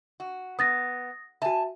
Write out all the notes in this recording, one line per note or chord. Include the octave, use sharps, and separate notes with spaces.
F#4
B3 D#6 A6 A#6
F#4 E5 G#5 A5